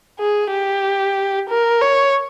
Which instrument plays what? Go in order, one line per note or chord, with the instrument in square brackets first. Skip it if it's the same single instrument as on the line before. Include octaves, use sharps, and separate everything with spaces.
[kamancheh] G#4
G4
A#4
C#5